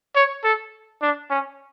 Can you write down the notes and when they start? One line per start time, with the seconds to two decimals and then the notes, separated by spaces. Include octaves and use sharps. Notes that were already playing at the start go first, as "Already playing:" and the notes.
0.16 C#5
0.44 A4
1.02 D4
1.30 C#4